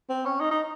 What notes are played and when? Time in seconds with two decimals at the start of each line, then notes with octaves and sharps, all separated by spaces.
0.10 C4
0.25 C#4
0.40 D#4
0.51 D#4